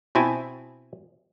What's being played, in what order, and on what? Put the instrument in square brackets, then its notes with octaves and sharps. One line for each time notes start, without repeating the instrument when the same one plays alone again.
[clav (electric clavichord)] B2 C4 E4 G#5 A5